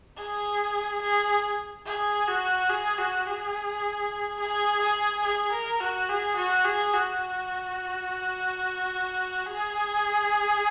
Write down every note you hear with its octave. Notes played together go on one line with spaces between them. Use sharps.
G#4
G#4
G#4
F#4
G#4
F#4
G#4
G#4
G#4
G#4
A#4
F#4
G#4
F#4
G#4
F#4
G#4